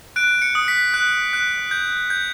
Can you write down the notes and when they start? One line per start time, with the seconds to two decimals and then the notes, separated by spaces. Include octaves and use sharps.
0.16 F#6 D7
0.42 C#7
0.55 D#6
0.68 B6
0.94 F#6
1.33 F#6
1.71 G6
2.10 G6